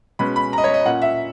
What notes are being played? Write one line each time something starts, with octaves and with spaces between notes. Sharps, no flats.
B2 G#3 C#4 B5
B5
D#5 A#5
C#5
D#5
A#2 A#3 C#4 F#5
E5